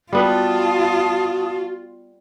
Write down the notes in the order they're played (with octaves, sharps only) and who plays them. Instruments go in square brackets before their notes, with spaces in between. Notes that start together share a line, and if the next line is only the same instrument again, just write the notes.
[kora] G3 B3 B4 [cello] F4 [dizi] F#4 [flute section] A5 D#6